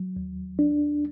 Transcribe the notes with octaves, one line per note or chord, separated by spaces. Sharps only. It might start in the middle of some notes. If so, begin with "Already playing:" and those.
Already playing: F#3
D#2
D4